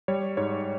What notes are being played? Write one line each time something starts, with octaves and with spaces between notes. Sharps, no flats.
G3 C#5
G#2 C#5